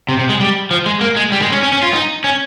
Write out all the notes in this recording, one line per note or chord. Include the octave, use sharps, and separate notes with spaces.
C3
C3
G#3
G3
F3
G#3
A#3
G#3
G3
G#3
C#4
C#4
C#4
F4
D#4
C#4